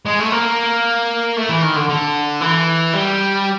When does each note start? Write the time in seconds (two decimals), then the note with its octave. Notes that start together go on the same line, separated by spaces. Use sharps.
0.06 G#3
0.19 A3
0.32 A#3
1.37 A3
1.49 E3
1.62 D#3
1.76 D3
1.89 D3
2.41 E3
2.93 G3